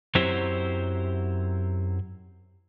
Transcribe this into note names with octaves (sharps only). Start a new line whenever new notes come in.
F#2 F#3 C4 E4 G4 C5